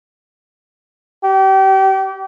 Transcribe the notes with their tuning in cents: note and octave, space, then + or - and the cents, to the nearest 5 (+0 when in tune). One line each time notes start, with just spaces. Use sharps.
G4 -30